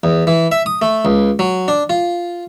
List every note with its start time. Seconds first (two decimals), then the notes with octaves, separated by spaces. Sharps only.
0.04 E2
0.27 E3
0.52 E5
0.66 D#6
0.82 A3
1.05 C#2
1.39 F#3
1.68 D4
1.90 F4